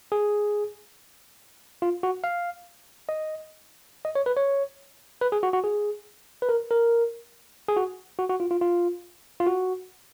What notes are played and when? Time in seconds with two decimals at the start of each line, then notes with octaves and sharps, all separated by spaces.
0.12 G#4
1.82 F4
2.03 F#4
2.24 F5
3.09 D#5
4.05 D#5
4.15 C#5
4.26 B4
4.37 C#5
5.21 B4
5.32 G#4
5.43 F#4
5.53 F#4
5.64 G#4
6.42 B4
6.49 A#4
6.71 A#4
7.68 G#4
7.77 F#4
8.19 F#4
8.30 F#4
8.40 F4
8.51 F4
8.61 F4
9.40 F4
9.47 F#4